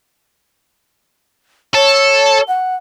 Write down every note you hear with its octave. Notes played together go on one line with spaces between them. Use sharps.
A4 C#5
F#5